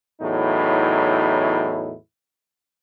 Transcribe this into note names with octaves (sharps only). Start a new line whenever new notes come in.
E2 A2 F#3 D#4 E4